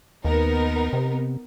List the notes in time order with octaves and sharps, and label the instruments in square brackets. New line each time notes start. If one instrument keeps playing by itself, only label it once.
[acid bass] D#2 [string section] B3 D#4 A#4
[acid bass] C3